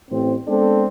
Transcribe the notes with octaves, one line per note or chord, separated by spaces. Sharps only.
A1 C4
G#3 B3 C4 D4 A4